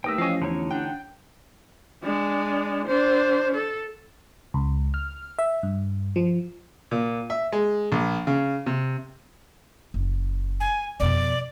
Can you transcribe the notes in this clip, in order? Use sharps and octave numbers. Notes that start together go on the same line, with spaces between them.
D#2 A3 A#4 B4 G5 D#6 E6
A1 F3 C#4 D#5 F5
E2 D3 D#4 C#5
D4 F#5 G5
G#3 D4
D4 C5
A4
C#2
F6
E5
G2
F3
A#2
E5
G#3
A#1
C#3
C3
F#1
G#5
F2 B2 D5